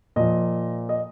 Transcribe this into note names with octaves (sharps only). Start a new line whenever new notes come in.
A#2 F3 D#5
D#5